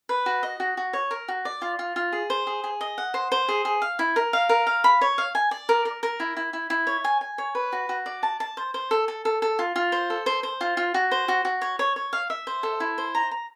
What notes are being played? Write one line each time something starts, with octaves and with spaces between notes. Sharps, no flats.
B4
F#4
D#5
F#4
F#4
C#5
A#4
F#4
D5
F4
F4
F4
G#4
C5
G#4
G#4
D#5
F#5
C5
C5
G#4
G#4
F5
E4
A#4
F5
A#4
F5
B5
C#5
F5
G#5
D5
A#4
A#4
A#4
E4
E4
E4
E4
C#5
G#5
G#5
C#5
B4
F#4
F#4
D5
A5
A5
C5
C5
A4
A4
A4
A4
F4
F4
C5
A4
C5
C5
F4
F4
F#4
C5
F#4
F#4
C#5
C#5
C#5
F5
E5
C5
A4
E4
C5
A#5
A#5